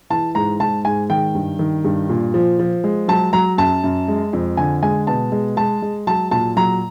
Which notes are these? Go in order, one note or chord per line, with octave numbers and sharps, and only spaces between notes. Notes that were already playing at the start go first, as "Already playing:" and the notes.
E3 A5
G#2 A#5
G#2 A5
G#2 G#5
D#3 G5
G2
D#3
G2
A#2
F3
F3
G#3
F#3 A5
F#3 A#5
F#2 A5
F#2
G#3
F2
D3 G#5
G#3 G#5
B2 A5
G#3
G#3 A5
G#3
F#3 A5
A#2 A5
F#3 A#5